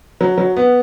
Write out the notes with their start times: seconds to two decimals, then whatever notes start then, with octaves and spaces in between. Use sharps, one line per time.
0.21 F#3
0.38 F#3
0.57 B3